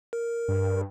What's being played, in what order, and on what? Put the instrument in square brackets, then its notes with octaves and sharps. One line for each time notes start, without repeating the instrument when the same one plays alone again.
[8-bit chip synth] A#4
[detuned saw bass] G2